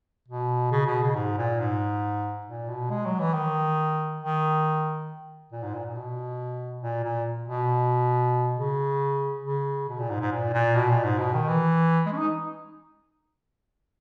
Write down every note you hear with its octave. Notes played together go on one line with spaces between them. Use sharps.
B2
C#3
B2
C#3
G#2
A#2
G#2
A#2
B2
G#3
F#3
E3
D#3
D#3
A#2
G#2
A#2
A#2
B2
A#2
A#2
B2
C#3
C#3
B2
A#2
G#2
G#2
A#2
A#2
B2
A#2
G#2
B2
D#3
E3
G#3
C#4
D#4